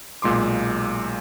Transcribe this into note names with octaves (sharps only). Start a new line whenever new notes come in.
B1 A#2 G#3 C6 D6